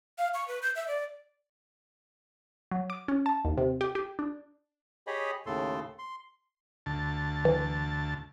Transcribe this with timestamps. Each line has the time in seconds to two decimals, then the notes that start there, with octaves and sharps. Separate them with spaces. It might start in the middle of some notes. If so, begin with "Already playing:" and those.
0.18 F5
0.34 C#6
0.48 B4
0.62 G6
0.76 E5
0.88 D5
2.71 F#3
2.90 D6
3.08 C#4
3.26 A5
3.45 D#2
3.57 C3
3.81 G4
3.95 G4
4.19 D4
5.07 G4 G#4 C#5 D#5 B5
5.46 D#2 A2 C#3 A4 C6
5.99 C6
6.86 D2 A5
7.45 E3